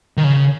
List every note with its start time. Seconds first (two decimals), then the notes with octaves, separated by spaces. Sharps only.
0.17 D#3
0.24 C#3